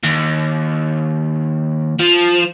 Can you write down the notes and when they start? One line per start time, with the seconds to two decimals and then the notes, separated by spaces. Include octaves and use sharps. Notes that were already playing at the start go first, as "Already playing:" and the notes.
0.04 D#2
1.99 F3